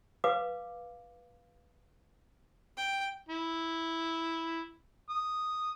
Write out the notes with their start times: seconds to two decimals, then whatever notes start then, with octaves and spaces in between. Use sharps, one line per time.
0.24 B4 F5 D6
2.77 G5
3.29 E4
5.10 D#6